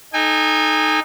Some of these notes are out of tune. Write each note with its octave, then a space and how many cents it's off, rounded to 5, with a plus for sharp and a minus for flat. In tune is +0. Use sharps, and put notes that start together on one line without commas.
D#4 -5 A4 -25 G#5 -40